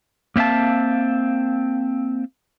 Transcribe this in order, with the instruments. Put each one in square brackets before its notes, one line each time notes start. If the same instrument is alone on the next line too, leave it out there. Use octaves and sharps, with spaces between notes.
[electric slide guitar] A#3 C4 E5 F5 A5